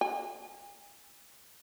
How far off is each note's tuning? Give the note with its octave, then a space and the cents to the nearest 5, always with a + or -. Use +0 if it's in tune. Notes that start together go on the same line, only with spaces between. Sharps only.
A4 +0 G#5 -40